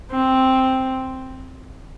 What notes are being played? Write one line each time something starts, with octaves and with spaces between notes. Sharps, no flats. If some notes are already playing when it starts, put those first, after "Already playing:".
C4